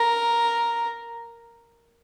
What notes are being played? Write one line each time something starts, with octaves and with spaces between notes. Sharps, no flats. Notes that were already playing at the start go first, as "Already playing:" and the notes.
Already playing: A#4